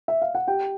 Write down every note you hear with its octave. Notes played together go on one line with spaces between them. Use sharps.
E5
F5
F#5
G4 G5